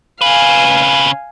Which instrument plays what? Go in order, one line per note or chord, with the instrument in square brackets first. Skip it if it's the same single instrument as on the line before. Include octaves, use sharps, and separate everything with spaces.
[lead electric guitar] C#3 B4 [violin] F5 G#5